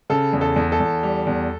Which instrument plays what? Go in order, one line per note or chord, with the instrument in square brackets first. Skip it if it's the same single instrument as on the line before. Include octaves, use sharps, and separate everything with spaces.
[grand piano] C#3 A4
E2
A4
E2
A4
E2
G3
E2